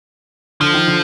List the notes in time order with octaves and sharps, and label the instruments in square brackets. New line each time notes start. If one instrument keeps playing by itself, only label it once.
[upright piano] D3 [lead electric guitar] F3
[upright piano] D#3
D3